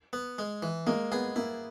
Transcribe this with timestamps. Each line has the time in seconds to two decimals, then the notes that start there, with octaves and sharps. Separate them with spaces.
0.13 B3
0.38 G#3
0.62 E3
0.87 G#3 A#3
1.12 B3 G#4
1.36 A#3 E4